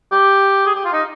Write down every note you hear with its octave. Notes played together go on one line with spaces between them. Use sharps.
G4
G#4
G4
F4
D#4